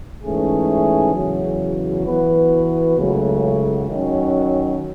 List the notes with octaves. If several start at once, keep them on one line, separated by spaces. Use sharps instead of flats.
G#2 E3 A3 C#4 G#4
E2 C#3 F#3
E3 B3 F#4 B4
C#2 C#3 F#3 A3
D#3 F#3 C#4